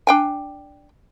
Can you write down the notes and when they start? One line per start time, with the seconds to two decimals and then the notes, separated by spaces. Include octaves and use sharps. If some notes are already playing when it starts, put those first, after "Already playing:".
0.07 D4 G5 G#5